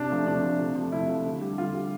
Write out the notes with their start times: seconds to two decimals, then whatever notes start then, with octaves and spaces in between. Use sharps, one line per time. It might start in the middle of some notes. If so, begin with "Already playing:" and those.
Already playing: C3 D4
0.10 F3 A3
0.26 C3 D4
0.43 F3 A3
0.59 C3
0.75 F3 A3
0.92 C3 E4
1.08 F3 A3
1.25 D3
1.41 G3
1.58 D3 F4
1.74 G3